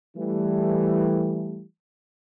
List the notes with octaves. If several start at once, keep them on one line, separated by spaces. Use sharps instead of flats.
E3 G3 A3